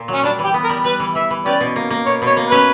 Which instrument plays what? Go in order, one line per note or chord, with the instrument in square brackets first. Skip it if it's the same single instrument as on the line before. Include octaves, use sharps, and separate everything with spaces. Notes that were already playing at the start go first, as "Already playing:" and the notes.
Already playing: [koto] A#2
F#3
[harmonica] C#4
[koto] G3 [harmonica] D4
[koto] E3
[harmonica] G4
[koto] B3
[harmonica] A#4
[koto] G3
[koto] G3 [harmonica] B4
[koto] E3
[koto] E3 [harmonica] E5
[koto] E3
[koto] C#4 [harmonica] G4 B4 D5
[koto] B2
A#3
A#3
[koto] B2 [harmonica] C#5
[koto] B2 [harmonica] C#5
[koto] A#3
[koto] C#4 [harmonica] B4